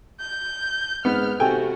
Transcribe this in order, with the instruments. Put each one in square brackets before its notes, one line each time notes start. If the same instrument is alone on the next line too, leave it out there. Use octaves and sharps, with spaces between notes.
[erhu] G6
[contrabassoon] G#2 [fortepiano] B3 [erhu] F6
[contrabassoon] C3 [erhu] F#4 [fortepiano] A4 G5 G#5